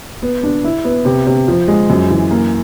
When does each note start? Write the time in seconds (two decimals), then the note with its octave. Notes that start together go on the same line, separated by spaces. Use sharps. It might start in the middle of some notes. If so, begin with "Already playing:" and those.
0.22 B3
0.43 D4
0.65 E4
0.85 B3
1.05 C3
1.27 C3
1.48 F3
1.68 G#3
1.90 F#2
2.10 E3
2.31 A#3